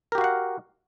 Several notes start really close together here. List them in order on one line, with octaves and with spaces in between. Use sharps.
A#4 G4 F#4 F5 F#5